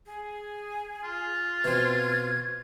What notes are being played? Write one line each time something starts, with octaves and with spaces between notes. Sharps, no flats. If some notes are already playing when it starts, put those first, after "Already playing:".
G#4
F4
B2 C4 G#6